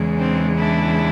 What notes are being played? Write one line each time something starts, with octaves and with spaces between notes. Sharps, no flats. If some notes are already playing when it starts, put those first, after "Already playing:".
Already playing: E2 C#3 E3 G#3
C4 D4
D4 E4